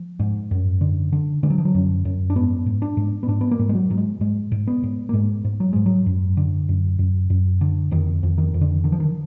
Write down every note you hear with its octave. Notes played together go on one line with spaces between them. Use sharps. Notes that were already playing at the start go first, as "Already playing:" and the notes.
Already playing: F3
G#2
F#2
D3
D3
D3 G#3
F#3
F3
F#3
F#2
F#2
D4
G#2 B3
G#2
D4
G#2
B3
G#2 D4
B3
A#3
G#2
G#3
F#3
G#2 F#3
G#3
G#2 G#3
G#2
B3
G#2
A#3
G#2 G#3
G#2
F#3
G#2 G#3
F#3
F#2
D3
F#2
F#2
F#2
D3
F2 D#3
F2
D#3
F2
D3
D3 D#3
F3
D#3